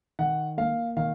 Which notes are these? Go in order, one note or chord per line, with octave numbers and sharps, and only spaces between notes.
D#3 F#5
A#3 F5
D#3 F5